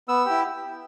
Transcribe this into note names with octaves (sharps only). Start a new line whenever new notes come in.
B3 E6
E4 G4